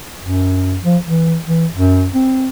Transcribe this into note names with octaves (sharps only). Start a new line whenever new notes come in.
F#2
F3
E3
E3
F#2
C4